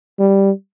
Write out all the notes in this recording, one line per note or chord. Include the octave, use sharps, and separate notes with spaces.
G3